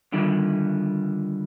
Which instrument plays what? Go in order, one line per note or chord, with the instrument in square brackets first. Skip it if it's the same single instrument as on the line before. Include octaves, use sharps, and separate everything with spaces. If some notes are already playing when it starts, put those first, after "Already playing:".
[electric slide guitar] D3 D#3 G3 D4 E4 F4